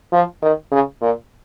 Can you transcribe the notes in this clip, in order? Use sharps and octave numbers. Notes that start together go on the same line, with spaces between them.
F3
D#3
C#3
A#2